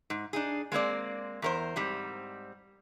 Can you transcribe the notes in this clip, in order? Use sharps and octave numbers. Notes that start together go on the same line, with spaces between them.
G#2
D4 D#4 G#4
G#3 A#3 C4 D5
E2 A#4 C5
G#2 G3 C4